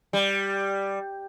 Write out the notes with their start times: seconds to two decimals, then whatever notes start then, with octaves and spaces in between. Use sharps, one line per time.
0.13 G3